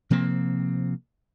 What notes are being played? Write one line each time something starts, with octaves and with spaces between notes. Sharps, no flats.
C3 F3 A#3 C4